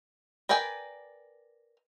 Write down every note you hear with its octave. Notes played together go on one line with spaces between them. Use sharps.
A#4 B4 D5 G5 G#5